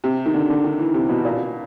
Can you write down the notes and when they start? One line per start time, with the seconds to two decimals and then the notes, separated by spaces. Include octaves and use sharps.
0.04 C3
0.26 D#3
0.34 D3
0.50 D3
0.64 D#3
0.79 E3
0.94 C3
1.09 B2
1.25 A#2